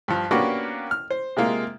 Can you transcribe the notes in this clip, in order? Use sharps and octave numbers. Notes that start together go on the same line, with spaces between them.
G2 F3
A#3 B3 C#4 D4 F#4 G4
F6
C5
C3 G#3 A#3 F4